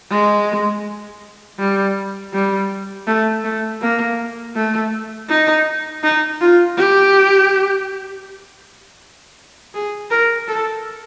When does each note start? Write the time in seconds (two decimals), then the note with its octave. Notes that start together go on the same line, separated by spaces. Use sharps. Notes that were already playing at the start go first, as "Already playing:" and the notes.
0.10 G#3
1.59 G3
2.33 G3
3.07 A3
3.44 A3
3.81 A#3
4.55 A3
5.29 D#4
6.03 D#4
6.41 F4
6.77 G4
9.74 G#4
10.11 A#4
10.48 A4